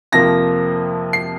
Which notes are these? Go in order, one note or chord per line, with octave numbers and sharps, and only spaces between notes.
F2 C3 F3 A#3 A#6
C7